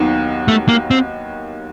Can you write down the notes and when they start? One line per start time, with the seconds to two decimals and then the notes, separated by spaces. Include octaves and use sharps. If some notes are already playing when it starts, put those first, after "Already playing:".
Already playing: D#2 D#3 F#3 B3 D#4
0.48 A3
0.69 A#3
0.91 C4